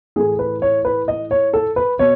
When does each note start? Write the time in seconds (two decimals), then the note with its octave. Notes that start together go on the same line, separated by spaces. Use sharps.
0.16 A2 E3 A3 G#4
0.39 B4
0.62 C#5
0.85 B4
1.08 D#5
1.31 C#5
1.53 A4
1.76 B4
1.99 B2 C#5